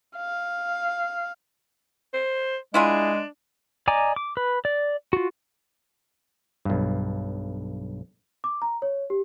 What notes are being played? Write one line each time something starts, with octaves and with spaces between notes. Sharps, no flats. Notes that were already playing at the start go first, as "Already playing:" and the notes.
F5
C5
G#3 D4 E4 F4 G#4
D5 D#5 G#5 A#5 D6
D6
B4
D5
F4 F#4
B1 G2
D6
A#5
C#5
G4